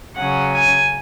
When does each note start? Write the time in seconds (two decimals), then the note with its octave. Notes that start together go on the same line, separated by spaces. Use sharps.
0.17 C#3 F#3 C#4 F#5
0.54 G#5